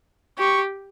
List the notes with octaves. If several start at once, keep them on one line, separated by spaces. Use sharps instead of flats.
G4 C#6